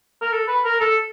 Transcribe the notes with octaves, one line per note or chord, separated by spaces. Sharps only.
A#4
A4
B4
A#4
A4